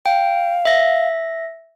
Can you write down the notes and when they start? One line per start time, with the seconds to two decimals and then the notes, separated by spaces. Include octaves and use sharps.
0.06 F5 G5
0.65 E5 A#6